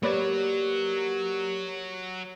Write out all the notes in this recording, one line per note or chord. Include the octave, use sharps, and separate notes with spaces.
F#3 A#3 G4 B4 C#5 D5